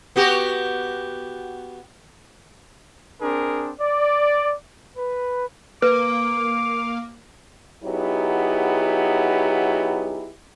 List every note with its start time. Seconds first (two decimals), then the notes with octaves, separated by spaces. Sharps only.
0.16 B3 F#4 G4
3.21 C4 D4 G#4 A#4
3.80 D5
4.96 B4
5.82 A#3 B4 D6
7.84 F#3 B3 D#4 E4 G4 G#4